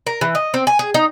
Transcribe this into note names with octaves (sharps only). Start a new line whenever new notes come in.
A#4
E3
D#5
C4
G#5
G#4
D#4